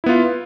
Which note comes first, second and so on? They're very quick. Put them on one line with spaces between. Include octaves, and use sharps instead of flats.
E4 B3 F4